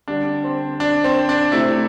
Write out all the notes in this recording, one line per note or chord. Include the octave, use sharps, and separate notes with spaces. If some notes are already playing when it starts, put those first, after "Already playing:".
D3 G3 D4
C4
D4
C4
D4
C3 A3 E4